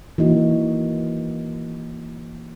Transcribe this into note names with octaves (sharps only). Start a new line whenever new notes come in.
E3 A#3 D#4 F#4